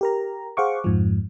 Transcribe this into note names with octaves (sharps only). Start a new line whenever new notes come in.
G4 A#4 A#5
G#4 C5 F5 F#5 C#6 D6
F2 G#2 F3